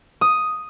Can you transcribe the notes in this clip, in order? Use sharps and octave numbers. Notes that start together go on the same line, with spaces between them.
D#6